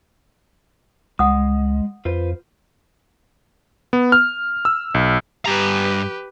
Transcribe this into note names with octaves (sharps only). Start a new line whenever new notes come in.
C#2 G#3 F#5 D#6
F2 F4 B4 C5
B3
F6
E6
B1
G2 G4 B4 A#5